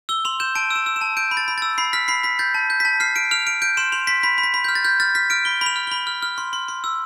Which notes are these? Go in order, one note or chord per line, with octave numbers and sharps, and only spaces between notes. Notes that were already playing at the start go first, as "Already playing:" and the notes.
E6 G7
C6 F7
G6 E7
A5 D7
E6 E7
E6
E7
A5
G6 D7
B5
A6
B5
A6
E6
B5 C7
F6 B6
B5 C7
B5 B6
G6 A6
A5
G6
B6
A5
F6 C7
F6 D7
F6 F7
F6 D7
G6 D7
C6 E7
C6 F7
C6 B6
B5 B6
B5
B6
B5
G6
F6
A6
F6 G6
F6 A6
F6 B6
F6 D7
B5 G7
B5
F7
F6
B5 G7
F6
F6
C6
C6
C6
E6